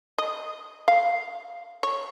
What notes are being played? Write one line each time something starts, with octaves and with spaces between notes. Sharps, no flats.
D#5
F5
C#5